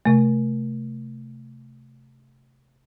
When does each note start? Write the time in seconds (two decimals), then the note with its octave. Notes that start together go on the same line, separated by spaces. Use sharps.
0.06 C3 A3